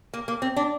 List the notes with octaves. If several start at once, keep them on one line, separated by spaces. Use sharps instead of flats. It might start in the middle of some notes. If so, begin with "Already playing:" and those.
A#3
A#3
C4
D4